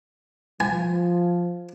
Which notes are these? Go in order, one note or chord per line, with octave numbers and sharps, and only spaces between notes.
F3 G#5